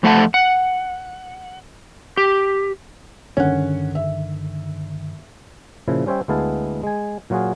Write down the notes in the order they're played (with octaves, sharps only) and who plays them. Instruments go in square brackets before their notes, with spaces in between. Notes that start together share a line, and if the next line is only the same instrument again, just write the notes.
[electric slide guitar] F2 A3 A4 E5 F#5 A5
F#5
G4
[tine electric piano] G2 D3 D#3 [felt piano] C#4 F#5
[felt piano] E5
[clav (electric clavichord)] A#2 C#3 F3 E4
G3 C#4 C5 C#5 E5 G5
D2 G#3 B3 E4 F5 A5
G#3 G#5
A#2 F#3 F4 F#4 G#4